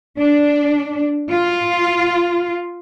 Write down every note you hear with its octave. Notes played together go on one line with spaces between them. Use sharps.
D4
F4